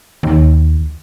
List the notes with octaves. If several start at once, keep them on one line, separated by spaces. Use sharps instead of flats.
D#2